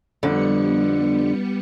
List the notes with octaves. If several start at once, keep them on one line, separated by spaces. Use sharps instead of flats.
F2 D3 G3 B3 C#7